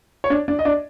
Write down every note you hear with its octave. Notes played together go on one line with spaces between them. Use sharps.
C#5
D4 D5
D4 D5
D#5
D4 D5